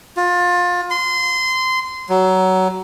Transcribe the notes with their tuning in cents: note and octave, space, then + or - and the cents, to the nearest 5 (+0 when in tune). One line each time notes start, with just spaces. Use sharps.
F4 +25
C6 -20
F#3 +15